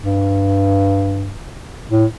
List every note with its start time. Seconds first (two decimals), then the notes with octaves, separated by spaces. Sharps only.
0.01 G2
1.90 A2